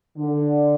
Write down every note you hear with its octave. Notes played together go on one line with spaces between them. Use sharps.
D3